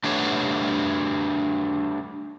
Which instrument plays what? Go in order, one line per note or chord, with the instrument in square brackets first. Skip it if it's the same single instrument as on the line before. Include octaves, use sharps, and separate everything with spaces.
[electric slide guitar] A3 D4 G4 B4 C#5 F#5